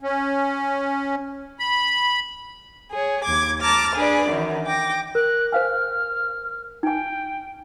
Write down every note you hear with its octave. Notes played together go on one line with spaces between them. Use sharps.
C#4
B5
G#4 C#5
D#2 D6 G#6
A5 A#5 D6 F6 A6
D4 G#4 B4 D5
F#2 D#3 E3
G5 D6 A#6
A#4 F#6
C5 F5 G#5 F6
D#4 G5 G#5